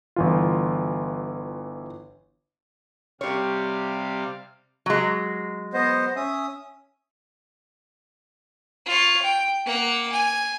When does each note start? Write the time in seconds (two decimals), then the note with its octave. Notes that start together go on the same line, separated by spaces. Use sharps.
0.16 G1 E3 F4
3.21 C3 G3 G4 C#5 F5
4.86 F#3 G#3
5.74 B3 C5 D#5
6.16 C#4 E5 D#6
8.86 F4 C#5
9.22 G5
9.66 A#3 F#5
10.12 G#5